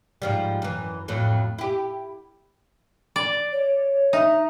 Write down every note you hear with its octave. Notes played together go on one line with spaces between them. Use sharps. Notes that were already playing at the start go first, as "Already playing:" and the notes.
G#2 F3 G3
F#2 E3
F2 A2 F#3
E4 G4
D5
C#5
D#4 E5